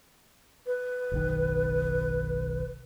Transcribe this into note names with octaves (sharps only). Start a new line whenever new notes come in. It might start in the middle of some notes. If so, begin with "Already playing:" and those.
B4
F#1 B1 D#3